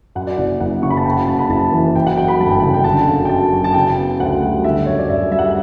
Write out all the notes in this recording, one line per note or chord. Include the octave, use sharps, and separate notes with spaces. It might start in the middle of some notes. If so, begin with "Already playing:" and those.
F#2 F#5
D5
F#1
F#1 F#5
C#3 C#6
B5
A5
F#2 G5
F#5
F#1 A5
B5
F#1 A5
E3
F#2 G5
F#5
F#3 G5
B5
G1 A5
G5
C#3 F#5
G5
D3 A5
F#2
G5
F#2 A5
F#3
A5
C#3 G5
B3
D2 F#5
G3
D3 E5
F#2 C#5
D5
F#2 E5
G3 E5
F#5
E5